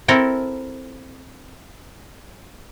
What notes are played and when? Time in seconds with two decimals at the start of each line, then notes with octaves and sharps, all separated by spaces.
0.08 C4 E4 A4 A#4